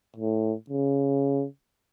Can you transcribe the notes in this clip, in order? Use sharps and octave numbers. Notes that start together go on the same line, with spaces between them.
A2
C#3